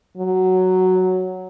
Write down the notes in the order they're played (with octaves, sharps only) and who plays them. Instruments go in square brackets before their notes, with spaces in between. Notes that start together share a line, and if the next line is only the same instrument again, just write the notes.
[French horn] F#3